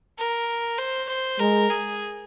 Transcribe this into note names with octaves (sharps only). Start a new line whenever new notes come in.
A#4
C5
C5
G#3 A#4
G#4